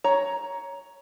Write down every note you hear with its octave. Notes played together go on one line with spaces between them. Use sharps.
C#5 A#5